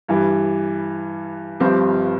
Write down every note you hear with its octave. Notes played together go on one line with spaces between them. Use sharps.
G2 E3 G3
G1 G2 F3 C4 G4